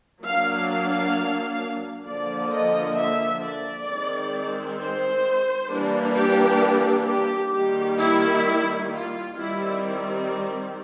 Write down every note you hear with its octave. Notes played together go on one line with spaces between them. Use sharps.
F#3 A#3 D4 F5
F5
D3 F3 A#3 D5
D#5
E5
D5
D#3 G#3 C4
C5
E3 G3 A#3 D4
G4
G4
D#3 G3 A#3 G4
E4
F4
D#3 G3 C4 E4